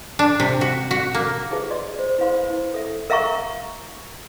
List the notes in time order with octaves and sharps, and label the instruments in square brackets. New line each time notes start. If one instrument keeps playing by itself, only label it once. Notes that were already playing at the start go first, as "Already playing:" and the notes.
[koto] D4
C3
F#4
F#4
A#3
[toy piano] D#4 F4 G4 G#4 B4 E5
F#4 D5 D#5 C6
C5
E4 B4 C5 F5 B5 C6
E4 B4
A4 E5
A#4 E5 F5 A#5 C#6